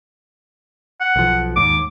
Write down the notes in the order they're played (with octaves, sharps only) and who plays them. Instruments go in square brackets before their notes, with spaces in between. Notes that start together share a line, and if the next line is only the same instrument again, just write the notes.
[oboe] F#5
[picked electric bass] B1 F3
[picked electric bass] D#2 G#2 [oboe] D6